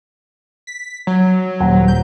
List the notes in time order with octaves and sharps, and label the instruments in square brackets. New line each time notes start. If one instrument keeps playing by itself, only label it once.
[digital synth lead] B6
F#3
[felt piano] D#1 F#5 A#5
[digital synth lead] G6